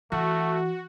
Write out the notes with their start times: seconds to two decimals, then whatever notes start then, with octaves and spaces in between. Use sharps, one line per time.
0.12 E3 A3 F#4